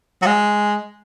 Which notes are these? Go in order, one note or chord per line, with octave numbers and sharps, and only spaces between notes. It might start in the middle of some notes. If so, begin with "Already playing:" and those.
F#3
G#3